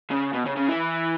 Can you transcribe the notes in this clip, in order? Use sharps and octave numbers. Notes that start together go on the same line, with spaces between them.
C#3
B2
C#3
C#3
E3